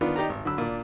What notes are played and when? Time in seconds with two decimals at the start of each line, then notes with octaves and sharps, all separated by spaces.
0.01 D#3 B3 D4 F4
0.16 D#4 G4 D5 A#5
0.29 G#1
0.45 D3 F#3 B5 E6
0.58 A#2 D4